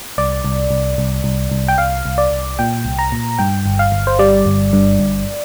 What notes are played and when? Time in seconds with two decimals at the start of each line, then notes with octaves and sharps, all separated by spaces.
0.18 C2 D5
0.45 C2
0.71 C2
0.98 C2
1.24 C2
1.52 C2
1.68 G5
1.78 C2 F5
2.05 C2
2.18 D5
2.31 C2
2.59 A#2 G5
2.85 C2
2.99 A#5
3.12 A#2
3.39 G2 G5
3.66 G1
3.79 F5
3.92 G1
4.07 C5
4.19 G3 D5
4.46 G1
4.73 G2
4.99 G1